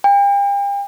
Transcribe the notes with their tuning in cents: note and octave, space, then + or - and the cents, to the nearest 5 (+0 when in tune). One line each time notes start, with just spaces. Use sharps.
G5 +40